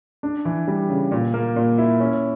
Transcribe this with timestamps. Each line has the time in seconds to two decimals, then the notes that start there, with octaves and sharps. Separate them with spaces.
0.23 D4
0.45 E3
0.68 G3
0.89 C#3
1.11 A#2
1.34 A#3
1.56 A#2
1.78 E4
2.00 C#4